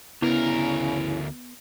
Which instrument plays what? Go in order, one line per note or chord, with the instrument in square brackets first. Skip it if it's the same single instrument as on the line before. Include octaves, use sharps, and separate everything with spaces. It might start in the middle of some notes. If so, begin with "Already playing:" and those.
[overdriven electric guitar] D2 A#4 [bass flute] C#3 [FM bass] B3 [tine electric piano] E4